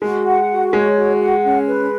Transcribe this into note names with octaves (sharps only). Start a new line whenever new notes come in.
G#3 F#4
F#5
F#4
G#3 C#5
F#4
F#5
C#4
B4